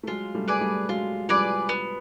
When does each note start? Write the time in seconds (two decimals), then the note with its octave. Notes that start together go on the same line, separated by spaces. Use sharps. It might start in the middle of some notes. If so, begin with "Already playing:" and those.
0.03 A3
0.07 F#3 G#3 F4
0.35 G3 A3
0.48 G#4 B4 D5
0.61 G3 A3
0.89 F#3 G#3 F4
1.29 F3 G3 G#4 B4 D5
1.69 B3